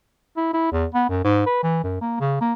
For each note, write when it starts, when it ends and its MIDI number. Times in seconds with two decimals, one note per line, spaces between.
0.37 0.53 64
0.54 0.72 64
0.72 0.86 40
0.94 1.09 59
1.09 1.22 42
1.24 1.43 44
1.46 1.63 71
1.63 1.82 52
1.83 2.01 42
2.01 2.18 58
2.21 2.41 49
2.41 2.53 58